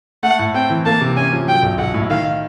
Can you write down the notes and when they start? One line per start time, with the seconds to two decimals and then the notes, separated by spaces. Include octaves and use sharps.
0.23 A3 F#5
0.39 A2
0.54 C4 G5
0.70 E3
0.86 A#3 A5
1.01 C3
1.17 C#4 G#5
1.32 F3
1.47 F#3 G5
1.63 B1
1.78 B1 F#5
1.94 A2
2.10 D#3 F5